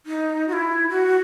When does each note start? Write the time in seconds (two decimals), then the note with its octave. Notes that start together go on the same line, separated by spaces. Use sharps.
0.06 D#4
0.48 F#4
0.53 E4
0.90 F#4